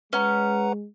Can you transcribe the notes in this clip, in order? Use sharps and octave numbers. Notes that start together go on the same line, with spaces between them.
G#3 C#4 B4 F#5 A#5